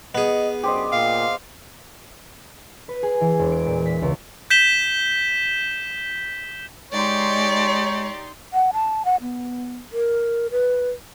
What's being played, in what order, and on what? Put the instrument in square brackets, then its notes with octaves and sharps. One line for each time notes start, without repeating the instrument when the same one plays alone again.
[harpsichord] B3 G#4 [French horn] D#5
[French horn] F#2 [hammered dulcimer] G4 C5 D#5
[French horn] A#2 [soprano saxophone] F5
[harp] B4
G#4
E3
E1
D7
A#2
B6
C#2
[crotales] G6 B6 E7 G7
[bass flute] G#3 [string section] D#4 C6 [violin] G4 D5 [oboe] C#5
[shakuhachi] F#5
A5
F#5
B3
A#4
B4